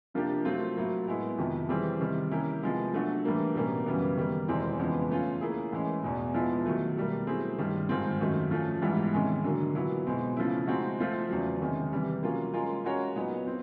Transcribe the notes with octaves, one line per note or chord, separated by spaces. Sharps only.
C3 F3 A#3 D4 G4
F#3 A3 C4 F4
A2 F#3 A#3
G#3 B3 E4
F2 C3 D#3
E3 G3 C4 E4 G#4
C3 D#3 G3
A#3 C#4 E4 G4 A#4
C3 F3 G#3 B3
F#3 A3 D4 F#4
A2 E3 G3 A#3 D4
B2 G3 A#3 C#4
F#2 C#3 E3 G3 B3
D#3 G3 A#3
E2 B2 G#3 C4 E4
F2 C#3 E3 G#3 B3
A3 C#4 F4
A#3 C#4 E4 G#4
A2 E3 G#3 C#4
E2 B2 G#3
F3 G#3 B3 E4
D#3 F#3 A3
B2 G3 A#3
F#3 A3 C4 E4 G#4
G2 D#3 G3
G#2 D#3 G#3 C4 F4
F#2 D#3 F#3 A3
F3 A3 C#4
G#2 E3 G3 B3 E4
C3 D#3 G#3 C#4
D3 F#3 A#3
A#2 F#3 B3 E4
B2 G#3 C4
C#3 F3 A3 C#4 E4
G#3 C4 D#4 F#4
F3 A3 C4 F4
E2 C#3 F#3
C3 D#3 G#3 C#4
C3 E3 G3
F#3 A#3 C#4 F4
G#3 C#4 F4 A#4
G#3 C#4 F#4 A#4 C#5
A#2 F#3 B3 D#4
C4